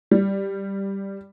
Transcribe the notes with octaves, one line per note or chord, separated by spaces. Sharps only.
G3